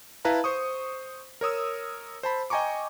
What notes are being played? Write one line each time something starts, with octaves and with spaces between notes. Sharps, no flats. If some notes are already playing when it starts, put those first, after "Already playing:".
E4 B4 F5 A5 A#5
C5 C#6 D#6
A#4 C#5 D#6 E6
C5 A5 B5
D#5 G5 G#5 A#5 C#6 D6